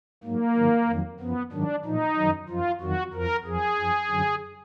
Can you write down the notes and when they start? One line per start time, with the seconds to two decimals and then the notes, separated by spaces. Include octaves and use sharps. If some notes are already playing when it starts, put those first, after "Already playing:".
0.24 G#2 F#3 A#3
0.56 G#2 D#3 F#3
0.89 F2 D#3 F#3
1.20 F#2 F3 B3
1.52 G#2 D#3 F#3 D4
1.85 A#2 F3 D#4
2.16 F#2 D#3 F#3
2.49 F#2 F3 F4
2.81 F2 D#3 F#3 F#4
3.14 F2 F3 A#4
3.45 F2 F3 G#4
3.78 F#2 F3
4.10 F#2 D3 F#3